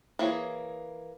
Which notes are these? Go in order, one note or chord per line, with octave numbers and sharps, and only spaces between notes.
E3 A#3 G#4 C#5